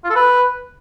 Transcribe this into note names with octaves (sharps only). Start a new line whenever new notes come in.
F4
A4
B4